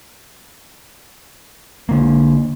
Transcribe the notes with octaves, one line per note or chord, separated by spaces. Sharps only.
D3 A#3